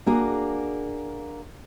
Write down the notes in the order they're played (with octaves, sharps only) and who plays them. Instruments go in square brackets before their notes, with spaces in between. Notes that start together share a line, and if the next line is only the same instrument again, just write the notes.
[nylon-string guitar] A#3 D4 F#4 G#4